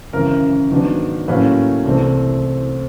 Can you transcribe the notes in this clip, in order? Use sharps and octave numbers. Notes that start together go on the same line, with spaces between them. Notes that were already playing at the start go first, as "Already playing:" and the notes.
G#1 F#2 C#3 E3 A#4
G#2 D#3 F#3 B3 D4
A2 F#3 A#3 C#4 B4
C2 C3 E3 A3 C4